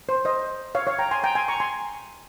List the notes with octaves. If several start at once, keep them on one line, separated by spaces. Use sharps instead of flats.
C5
C5 D#5
C#5 F5
C#5 F5
G5 A#5
G#5 C6
G5 A#5
G#5 C6
A#5 C#6
G#5 C6